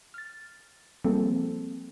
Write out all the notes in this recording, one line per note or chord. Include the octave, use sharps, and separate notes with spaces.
F6 A6
F3 G3 A#3 C4 G#4 A4